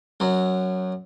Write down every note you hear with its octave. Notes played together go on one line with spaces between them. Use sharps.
F#2 F#3